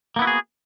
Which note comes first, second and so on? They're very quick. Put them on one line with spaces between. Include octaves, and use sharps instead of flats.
A#3 B3 E4 F#4 G#4